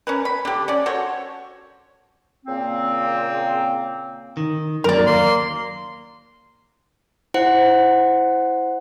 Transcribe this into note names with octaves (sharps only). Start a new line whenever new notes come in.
C#4 A#4 B4
B5
D3 G4
C#4 D5
F#4 A4 C5 C#5
A#2 C#3 A#3 C4
D#3
F#2 F#3 A#3 A#4 D5
D#2 A#3 C6
E4 C5 F#5